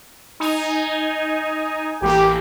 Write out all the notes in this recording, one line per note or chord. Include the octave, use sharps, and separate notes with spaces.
D#4 G#5
A1 E3 A#3 G4